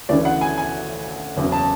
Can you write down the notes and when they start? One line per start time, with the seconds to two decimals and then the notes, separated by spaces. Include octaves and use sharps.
0.09 D2 C#3 E3 D5
0.25 F#5
0.41 G#5
0.58 G#5
1.37 F#1 E2 C#3 F#3
1.52 A5